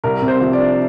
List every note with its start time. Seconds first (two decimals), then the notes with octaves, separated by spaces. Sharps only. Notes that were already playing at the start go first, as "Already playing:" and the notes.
0.04 C2 A#4
0.22 C3
0.28 C5
0.41 F3
0.53 D5
0.59 D4